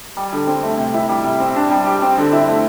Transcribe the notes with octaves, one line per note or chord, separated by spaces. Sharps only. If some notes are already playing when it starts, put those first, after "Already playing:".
G3
D3
C4
A3
C3
E4
G3
C3
C4
D4
G3
G4
C4
D3
E4
A3